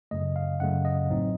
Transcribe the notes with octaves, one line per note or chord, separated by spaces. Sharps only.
F#2 C#3 A3 D#5
F5
F#2 C#3 A3 F#5
D#5
A1 A2 F#3 C4 D#4